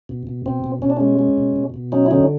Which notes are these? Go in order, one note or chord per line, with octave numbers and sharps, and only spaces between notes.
B2
B2
B2 C4
B2
B2 C#4
D4
G#3 C#4
G#3
B2
B2
B2
F#3 C#4 D#4
E4
D3 C#4 D#4